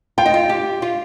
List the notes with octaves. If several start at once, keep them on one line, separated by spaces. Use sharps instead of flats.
F4 G5
D#4
F4
G4
F4